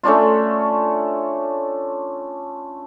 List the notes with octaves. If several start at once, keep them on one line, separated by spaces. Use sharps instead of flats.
A3 C#4 D4 F4